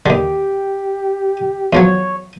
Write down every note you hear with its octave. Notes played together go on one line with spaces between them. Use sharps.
D#2 D3 G4
E2 F3 F#3 C#5